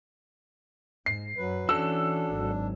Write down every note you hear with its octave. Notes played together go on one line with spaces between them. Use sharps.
G#2 C7
F#2 F#3 B4
E3 C#4 D4 F#4 A4 E6
G#1 F#3